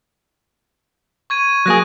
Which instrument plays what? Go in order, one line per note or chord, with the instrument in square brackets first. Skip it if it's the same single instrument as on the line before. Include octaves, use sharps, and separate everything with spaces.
[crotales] C#6 G#6 D#7
[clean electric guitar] F#3 A#3 G#4 [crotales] F#6 A#6 D#7